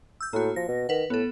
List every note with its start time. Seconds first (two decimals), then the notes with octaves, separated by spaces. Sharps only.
0.21 E6 G6
0.33 A2 A#3 F#4
0.56 F3 A#6
0.68 B2
0.89 D#3 B4 F#5
1.10 A2 B3 A4